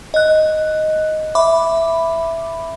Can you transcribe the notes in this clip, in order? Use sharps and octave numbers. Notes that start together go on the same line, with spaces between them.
D#5 F#6
E5 B5 D6